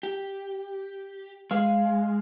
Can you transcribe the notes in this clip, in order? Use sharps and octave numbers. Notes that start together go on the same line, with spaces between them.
G4
G#3 F5